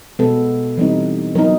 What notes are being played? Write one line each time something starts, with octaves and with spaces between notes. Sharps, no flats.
B2 G#3 B3 A4
E3 G3 C4 D#4
F#3 B3 D#4 A#4